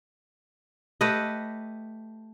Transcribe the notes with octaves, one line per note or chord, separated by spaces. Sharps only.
A3 G4 B4 D#5